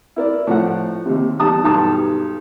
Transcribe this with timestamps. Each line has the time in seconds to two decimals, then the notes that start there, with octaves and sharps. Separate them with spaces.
0.16 E4 A#4 D5
0.47 A2 F3 F#5
1.06 D#2 C3
1.40 E2 G3 D#4 A5 D#6
1.64 B1 G2 A5 D#6